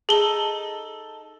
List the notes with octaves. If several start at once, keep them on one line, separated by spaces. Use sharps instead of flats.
D#4 G#4 A4 G7